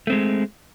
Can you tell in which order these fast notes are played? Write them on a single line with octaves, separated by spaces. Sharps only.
A3 C4 G#3